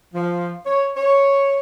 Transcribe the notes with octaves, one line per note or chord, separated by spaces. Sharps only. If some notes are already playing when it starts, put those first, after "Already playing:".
F3
C#5
C#5